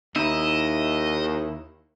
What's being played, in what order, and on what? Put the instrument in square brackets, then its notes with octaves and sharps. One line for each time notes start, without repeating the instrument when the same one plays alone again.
[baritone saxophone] D#2 [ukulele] D#4 [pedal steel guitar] E4 E5 [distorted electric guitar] D#5